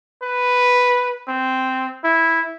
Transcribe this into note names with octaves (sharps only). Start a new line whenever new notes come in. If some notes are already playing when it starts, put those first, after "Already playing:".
B4
C4
E4